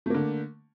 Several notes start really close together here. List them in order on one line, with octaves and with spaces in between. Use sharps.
A3 A#3 D3